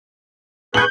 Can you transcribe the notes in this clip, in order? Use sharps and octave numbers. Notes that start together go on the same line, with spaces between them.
G#4 B4 C#6 G6 F#7